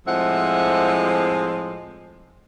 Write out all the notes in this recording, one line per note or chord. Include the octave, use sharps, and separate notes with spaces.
A2 F3 G#3 C4 E5 F#5